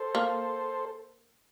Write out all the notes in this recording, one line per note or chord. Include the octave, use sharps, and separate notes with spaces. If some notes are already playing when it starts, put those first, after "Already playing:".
Already playing: A4 C5
A#3